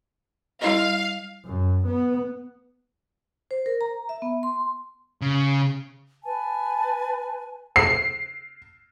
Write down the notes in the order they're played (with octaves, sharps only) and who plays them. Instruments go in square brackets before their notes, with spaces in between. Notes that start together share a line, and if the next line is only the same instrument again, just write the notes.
[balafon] G3 E4 D#5 [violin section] F5
[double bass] F#2
B3
[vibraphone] C5
A#4
A#5
E5
B3
C6
[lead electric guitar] C#3
[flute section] B4 G#5 A5
[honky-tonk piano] C7